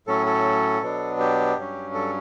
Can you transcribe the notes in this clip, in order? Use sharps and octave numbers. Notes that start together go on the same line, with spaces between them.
A2 F#3 C#4 A4
A4
B2 F#3 B3 D4
G4
G2 F#3 C#4
A4